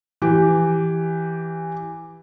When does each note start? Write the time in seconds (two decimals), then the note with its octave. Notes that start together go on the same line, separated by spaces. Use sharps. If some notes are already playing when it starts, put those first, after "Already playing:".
0.22 E3 G4